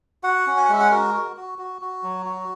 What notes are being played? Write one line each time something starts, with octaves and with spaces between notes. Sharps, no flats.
F#4 F#5
C#4
G#5
F#5
G#3 E5
F#5
F#4 A#4
F#4
F#4
F#4
F#4
F#3
F#4